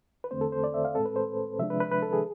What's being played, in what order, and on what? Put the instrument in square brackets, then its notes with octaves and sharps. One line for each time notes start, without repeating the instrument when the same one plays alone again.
[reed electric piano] B4
E2 D3 A3 C4 C5
A4
C5
D5
E5
F5
A2 G#3 C4 A4
B4
C5
C3 F3 G#3 D4 E5
B4
B4
B4
A4
G#4